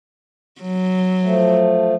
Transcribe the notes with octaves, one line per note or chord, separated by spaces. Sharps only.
F#3
F3 A3